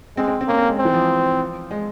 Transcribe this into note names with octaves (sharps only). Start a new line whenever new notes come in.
G#3 C4
C4
C4
A#3 C#4
C4
G#3
C4
E3
F3
G#3